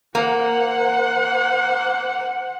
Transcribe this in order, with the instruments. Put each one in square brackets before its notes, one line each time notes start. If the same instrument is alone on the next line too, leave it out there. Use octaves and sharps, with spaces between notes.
[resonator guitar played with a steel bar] A#3 [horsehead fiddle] C5 F#5